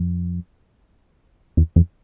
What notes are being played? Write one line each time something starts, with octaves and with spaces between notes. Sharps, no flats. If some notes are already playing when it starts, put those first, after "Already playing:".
Already playing: F2
E2
F2